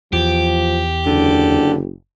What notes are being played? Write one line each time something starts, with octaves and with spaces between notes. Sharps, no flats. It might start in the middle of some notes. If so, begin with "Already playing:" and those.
E2 F3 G4
F#1 D3